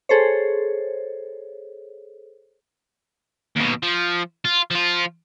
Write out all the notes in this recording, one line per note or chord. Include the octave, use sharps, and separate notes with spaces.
G#4 A4 C5 C#5
D#2 B2
F3
F4
F3 F4